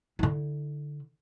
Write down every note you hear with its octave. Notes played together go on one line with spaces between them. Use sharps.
D3 E4